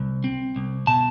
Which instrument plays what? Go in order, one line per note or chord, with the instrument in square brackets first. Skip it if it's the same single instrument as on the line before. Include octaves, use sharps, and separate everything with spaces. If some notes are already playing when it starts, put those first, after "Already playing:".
Already playing: [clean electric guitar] C2
C4
C2
B2 A5